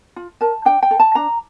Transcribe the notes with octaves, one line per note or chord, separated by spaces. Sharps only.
F4
A#4 A5
D4 G5
G5
A4
A5
D4 A#5